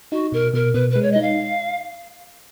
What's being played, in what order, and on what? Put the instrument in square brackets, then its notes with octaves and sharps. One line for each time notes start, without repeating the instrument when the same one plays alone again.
[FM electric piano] D#4 [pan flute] F#4
[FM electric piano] B2 [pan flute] A#4
[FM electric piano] B2 [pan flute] A#4
[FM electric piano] B2 [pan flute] B4
[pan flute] B4
[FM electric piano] G#3
[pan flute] C#5
D#5
[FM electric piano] D#4
[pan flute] F5